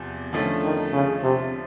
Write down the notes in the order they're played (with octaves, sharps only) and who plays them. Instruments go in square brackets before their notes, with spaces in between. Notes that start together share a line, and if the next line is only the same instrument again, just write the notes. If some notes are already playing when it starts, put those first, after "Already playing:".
Already playing: [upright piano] E2 C3 F3
[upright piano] D3 F3 A3 C#4 [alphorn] D#3
[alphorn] D#3
C#3
C3